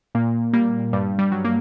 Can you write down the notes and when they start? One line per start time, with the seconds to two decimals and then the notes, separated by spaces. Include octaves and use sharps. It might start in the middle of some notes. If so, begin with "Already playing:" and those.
0.15 A#2 A#3
0.53 G3 A#3
0.93 G2 G3
1.19 G3
1.32 F#3
1.45 A#3